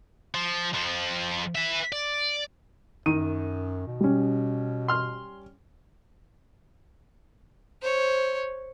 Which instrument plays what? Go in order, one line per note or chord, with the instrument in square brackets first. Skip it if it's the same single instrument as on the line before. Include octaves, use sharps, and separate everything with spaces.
[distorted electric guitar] F3
F2 F3
B4 E5
D5
[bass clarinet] F#2 [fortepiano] D#3 [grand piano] D#7
[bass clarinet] B2
[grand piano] G3 C#4
[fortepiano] C6 F6
[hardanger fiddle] C5 C#5